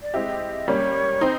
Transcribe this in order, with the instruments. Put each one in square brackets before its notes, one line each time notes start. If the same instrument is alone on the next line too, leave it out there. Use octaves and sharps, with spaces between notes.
[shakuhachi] D5
[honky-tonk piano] G#3 C4 E4 G4 [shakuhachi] D#5
[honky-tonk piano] G3 A#3 C#4 [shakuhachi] C#5
[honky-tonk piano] C4 D#4 [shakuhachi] C5